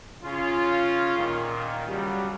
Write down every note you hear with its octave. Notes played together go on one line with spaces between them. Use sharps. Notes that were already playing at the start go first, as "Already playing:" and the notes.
C#3 C#4 F4
A#2 D#3
C#3 F#3 G3